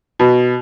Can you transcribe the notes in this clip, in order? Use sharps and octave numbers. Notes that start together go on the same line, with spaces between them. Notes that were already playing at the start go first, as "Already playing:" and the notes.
B2